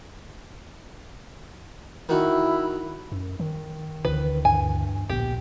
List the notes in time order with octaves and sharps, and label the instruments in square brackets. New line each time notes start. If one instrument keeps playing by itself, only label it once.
[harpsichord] D#3 F#4 [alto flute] E4
[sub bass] F#2
D#3
[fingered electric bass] D2 D3 E3 [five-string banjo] B4
[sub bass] G2 [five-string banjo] G#5
[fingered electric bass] D1 A#2 B3 [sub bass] A#1 [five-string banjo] G4